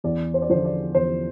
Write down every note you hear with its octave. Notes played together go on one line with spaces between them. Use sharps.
E2 D5
C5
D5
D3 F3 C5
D5
E2 C5